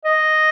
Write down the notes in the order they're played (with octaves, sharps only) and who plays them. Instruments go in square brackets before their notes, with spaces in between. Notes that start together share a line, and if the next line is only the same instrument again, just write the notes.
[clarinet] D#5